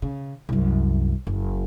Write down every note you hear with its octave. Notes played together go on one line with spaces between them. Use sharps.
C#3
C2 F#2
F#1